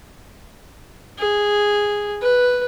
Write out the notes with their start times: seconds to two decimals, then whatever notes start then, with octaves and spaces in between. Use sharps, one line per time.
1.18 G#4
2.22 B4